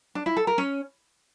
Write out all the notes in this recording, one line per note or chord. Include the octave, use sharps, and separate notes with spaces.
D4
E4
A4
A#4
C#4